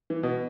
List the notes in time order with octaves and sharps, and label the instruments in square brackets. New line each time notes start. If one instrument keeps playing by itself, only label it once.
[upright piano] E3
B2